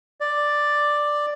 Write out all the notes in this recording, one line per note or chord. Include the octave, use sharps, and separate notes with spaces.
D5